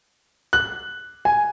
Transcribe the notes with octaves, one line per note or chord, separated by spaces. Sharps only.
F#6
G#5